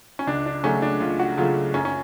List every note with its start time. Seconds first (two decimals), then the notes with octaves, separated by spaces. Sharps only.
0.19 C#4
0.27 C#2 D4
0.46 D4
0.63 C#3 F#3 A3 C#4
0.82 D4
1.00 C#2 F4
1.19 F#4
1.38 C#3 F#3 A3 F4
1.74 F#2 C#4
1.85 C#4